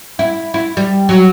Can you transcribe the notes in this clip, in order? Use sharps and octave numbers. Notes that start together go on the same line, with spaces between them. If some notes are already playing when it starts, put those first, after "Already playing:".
E4
E4
G3
F#3